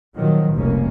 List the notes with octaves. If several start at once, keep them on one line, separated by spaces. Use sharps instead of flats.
A#2 D#3 F3 F#3
F1 C2 B2 A#3 C#4